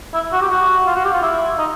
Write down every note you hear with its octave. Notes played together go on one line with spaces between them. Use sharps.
E4
F#4
G4
F#4
F4
F#4
G4
F4
E4
D#4